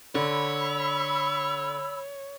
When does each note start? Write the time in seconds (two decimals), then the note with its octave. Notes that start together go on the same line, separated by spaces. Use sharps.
0.15 D3 C#5 B5 E6